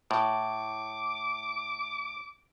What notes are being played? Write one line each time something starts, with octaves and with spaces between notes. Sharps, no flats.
A2 D6